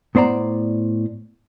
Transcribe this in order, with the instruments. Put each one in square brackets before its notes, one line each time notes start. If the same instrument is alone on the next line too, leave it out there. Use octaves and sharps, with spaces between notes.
[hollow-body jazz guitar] A2 B3 C5 D5 A#5